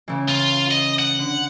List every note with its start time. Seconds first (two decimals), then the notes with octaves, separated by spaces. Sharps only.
0.08 C#3 E3
0.29 F4
0.71 D#5
0.99 F#5
1.19 D3